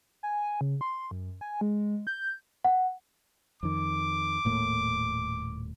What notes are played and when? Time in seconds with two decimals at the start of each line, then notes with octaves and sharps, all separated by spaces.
0.23 G#5
0.61 C#3
0.81 C6
1.11 F#2
1.41 G#5
1.61 G#3
2.07 G6
2.65 F#5
3.63 F2 D#3 D6
4.45 D#1 A2 A#3